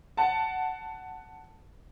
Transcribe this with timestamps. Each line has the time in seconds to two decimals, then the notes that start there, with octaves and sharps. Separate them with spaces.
0.17 F#5 A5